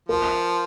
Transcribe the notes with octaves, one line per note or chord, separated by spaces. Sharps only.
F3 A#4